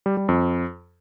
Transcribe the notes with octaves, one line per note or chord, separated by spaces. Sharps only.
G3
G3
F2